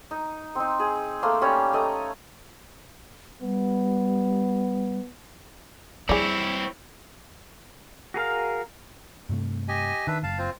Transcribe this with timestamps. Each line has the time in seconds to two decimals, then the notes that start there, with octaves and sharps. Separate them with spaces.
0.11 D#4
0.55 C4 D#4
0.80 G#4
1.22 A3 A#3 F5 C6
1.41 G3 C#4 C#5
1.73 A3 D#5 A#5
3.41 G3 B3
6.09 G3 C4 E4 G#4 C#5 D5
8.14 F#4 G#4 A#4 F5
9.29 G2 C3 A3
9.68 G4 D#5 G#5
10.07 D#3 D4 B4 E5
10.23 F#1 F5 A5
10.39 C4 F4 C5